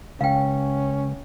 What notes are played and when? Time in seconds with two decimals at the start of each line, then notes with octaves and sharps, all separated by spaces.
0.21 C#2 C#4 F5 G5